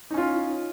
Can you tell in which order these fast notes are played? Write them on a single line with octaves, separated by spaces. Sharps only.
D#4 C#4 F4